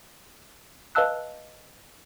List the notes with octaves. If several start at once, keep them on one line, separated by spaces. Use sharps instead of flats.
B4 D#5 F5 A5 E6 F#6